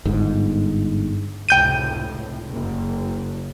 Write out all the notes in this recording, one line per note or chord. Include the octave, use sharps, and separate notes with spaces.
G1 G#2
F1 C#2 A2 G5 G6 D#7
F#1